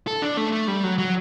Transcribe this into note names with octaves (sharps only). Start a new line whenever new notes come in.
A4
D4
A3
A3
G3
F#3
F#3